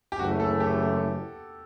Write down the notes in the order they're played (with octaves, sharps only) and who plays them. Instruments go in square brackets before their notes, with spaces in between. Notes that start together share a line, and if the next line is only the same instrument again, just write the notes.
[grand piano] G4
[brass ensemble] F#1 F#2 E3 A3 [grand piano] F#4
[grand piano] A4
G4